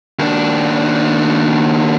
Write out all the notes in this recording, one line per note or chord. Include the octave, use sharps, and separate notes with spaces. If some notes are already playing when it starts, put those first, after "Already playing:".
D#2 D4